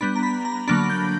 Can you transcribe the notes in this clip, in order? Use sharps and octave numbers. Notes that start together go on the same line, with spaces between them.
G3 B3 D4 B5
A#5
B5
A#5
D3 F#3 A#3 D4 B5
G6